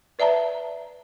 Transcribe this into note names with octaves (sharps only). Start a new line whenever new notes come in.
B4 D5 E5 A5 A#5